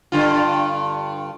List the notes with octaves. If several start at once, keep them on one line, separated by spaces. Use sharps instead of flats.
G2 D3 F4